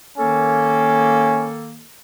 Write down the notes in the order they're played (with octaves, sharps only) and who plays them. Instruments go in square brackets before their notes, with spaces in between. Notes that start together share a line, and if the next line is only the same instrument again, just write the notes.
[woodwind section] D#3 A#3 A4 [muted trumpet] C#4